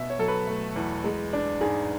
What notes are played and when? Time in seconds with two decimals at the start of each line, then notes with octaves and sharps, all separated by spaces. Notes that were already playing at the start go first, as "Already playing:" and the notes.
Already playing: B2 E5
0.10 C#5
0.18 F#3 A4
0.28 B4
0.47 A3
0.76 E2
1.04 G#3
1.33 D4
1.61 G#2 G#4